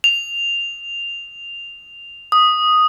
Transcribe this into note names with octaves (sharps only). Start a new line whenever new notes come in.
F7
D#6